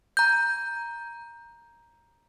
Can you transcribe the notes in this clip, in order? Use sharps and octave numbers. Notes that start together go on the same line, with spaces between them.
A#5 G6